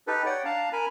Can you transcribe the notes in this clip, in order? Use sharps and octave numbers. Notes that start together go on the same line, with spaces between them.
D#4 G4 A4 B4
C#5 D5 F#5 G5
D4 F5 A5 A#5
A#4 G#5 A#5 B5